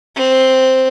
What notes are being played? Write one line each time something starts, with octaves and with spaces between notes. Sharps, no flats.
C4